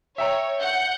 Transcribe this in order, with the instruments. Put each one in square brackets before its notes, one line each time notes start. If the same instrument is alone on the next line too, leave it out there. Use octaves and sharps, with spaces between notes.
[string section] C#5 [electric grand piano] E5 G5 A#5
[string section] F#5 G6